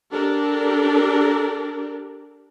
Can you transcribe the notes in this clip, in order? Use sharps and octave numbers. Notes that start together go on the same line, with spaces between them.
D4 G4 A4 A#4